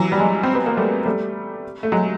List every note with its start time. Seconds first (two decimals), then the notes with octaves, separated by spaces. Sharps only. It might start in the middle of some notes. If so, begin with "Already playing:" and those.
Already playing: E3 F#3
0.12 G3
0.20 F#3 G#3
0.43 C4
0.55 B3
0.66 A#3
0.77 G3 A3
1.06 G3 A3
1.83 A3
1.92 F#3 G#3